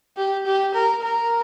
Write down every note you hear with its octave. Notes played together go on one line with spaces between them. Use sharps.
G4
G4
A#4
A#4